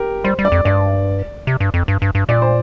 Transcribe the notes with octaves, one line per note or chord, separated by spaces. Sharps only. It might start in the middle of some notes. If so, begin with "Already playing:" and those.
Already playing: G4 A#4
G3 C5
G3
D5
F2
G2 D5
C3
G2
F2
G2
G2
G2
A#2 D5
C5